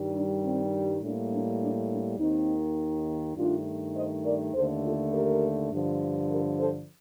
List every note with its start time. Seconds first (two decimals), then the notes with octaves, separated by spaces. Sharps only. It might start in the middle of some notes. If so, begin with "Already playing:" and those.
Already playing: G2 D#3 G3
0.14 D4
0.43 C4
1.02 A2 G3 A#3 D4
1.31 D4
1.60 D4
1.90 D4
2.19 D#2 D#3 A#3 C4 D#4
3.36 G2 D#3 A3 D4 F4
3.95 C5 D#5
4.24 A#4 D5
4.54 D#2 D3 A3 A4 C5
4.83 F4 A4
5.12 G4 A#4
5.71 G2 D3 F3
6.30 G4 A#4
6.59 A4 C5